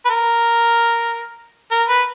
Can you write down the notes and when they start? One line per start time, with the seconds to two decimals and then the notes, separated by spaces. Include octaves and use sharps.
0.05 B4
0.09 A#4
1.71 A#4
1.89 B4